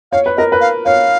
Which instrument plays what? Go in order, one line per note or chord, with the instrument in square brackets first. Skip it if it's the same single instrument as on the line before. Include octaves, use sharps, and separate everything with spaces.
[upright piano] C#5 [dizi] F5
[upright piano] B4
[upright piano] A#4 [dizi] D#5
[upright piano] B4
[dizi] F5
[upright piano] C#5 [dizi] F5